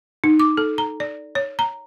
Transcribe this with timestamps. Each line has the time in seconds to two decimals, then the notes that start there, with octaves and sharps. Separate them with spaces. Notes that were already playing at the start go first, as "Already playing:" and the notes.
0.24 D#4
0.40 D6
0.57 A4
0.78 A#5
1.00 D5
1.35 C#5
1.59 A#5